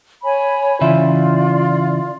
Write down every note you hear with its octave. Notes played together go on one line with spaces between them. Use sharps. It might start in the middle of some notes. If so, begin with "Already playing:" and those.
C#5 G#5 B5
C#3 E3 F4 D5 E5